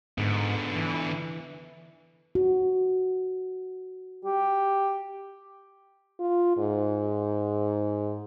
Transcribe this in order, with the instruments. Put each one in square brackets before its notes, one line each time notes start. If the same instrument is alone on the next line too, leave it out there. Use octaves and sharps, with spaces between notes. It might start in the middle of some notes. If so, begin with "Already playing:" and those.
[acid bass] G#2 [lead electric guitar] D3 B3
[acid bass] E3
[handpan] F#4
[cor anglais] G4
[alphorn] F4
G#2